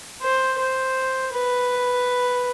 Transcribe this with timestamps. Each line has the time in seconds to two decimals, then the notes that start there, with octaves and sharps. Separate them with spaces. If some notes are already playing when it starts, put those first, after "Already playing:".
0.22 C5
0.59 C5
1.32 B4